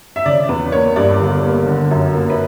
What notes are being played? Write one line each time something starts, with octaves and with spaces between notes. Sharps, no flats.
E5
C#3 D5
E2 B4
A#3 C#5
G2 D5
G1
A#3
D3
F#2
A#3
B4